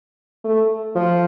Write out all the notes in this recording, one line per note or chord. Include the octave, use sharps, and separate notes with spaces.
A3
F3